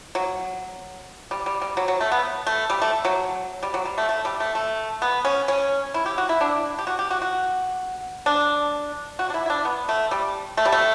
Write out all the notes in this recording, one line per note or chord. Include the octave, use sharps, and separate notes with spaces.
F#3
G3
G3
G3
F#3
F#3
A3
B3
A3
G3
A3
F#3
G3
F#3
G3
A3
A3
G3
A3
A3
B3
C#4
C#4
E4
G4
F#4
E4
D4
G4
F#4
G4
F#4
F#4
D4
F#4
D4
E4
E4
D4
B3
A3
G3
A3
G3
A3